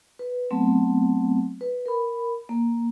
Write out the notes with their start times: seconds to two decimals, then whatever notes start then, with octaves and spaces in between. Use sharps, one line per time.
0.19 B4
0.51 F#3 A3 B3 C4
1.61 B4
1.86 A#4 B5
2.49 A#3